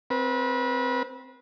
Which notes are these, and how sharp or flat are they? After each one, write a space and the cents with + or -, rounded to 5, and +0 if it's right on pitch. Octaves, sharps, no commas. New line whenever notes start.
C4 -5 B4 -30